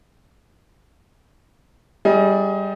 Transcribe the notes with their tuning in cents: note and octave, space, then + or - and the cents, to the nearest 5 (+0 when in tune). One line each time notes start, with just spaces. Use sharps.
G3 +0 G#4 +0 D#5 +30